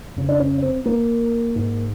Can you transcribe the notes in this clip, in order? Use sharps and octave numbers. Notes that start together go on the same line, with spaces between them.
F2 C#3
D4
C#4
C4
A#3
G#2